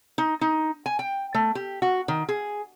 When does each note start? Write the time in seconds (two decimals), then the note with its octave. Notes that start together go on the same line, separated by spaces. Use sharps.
0.18 D#4
0.41 D#4
0.86 G#5
0.99 G5
1.34 A3
1.55 G4
1.82 F#4
2.08 D#3
2.29 G#4